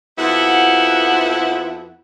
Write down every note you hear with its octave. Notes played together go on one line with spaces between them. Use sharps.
F2 F3 B3 E4 F#4 F#5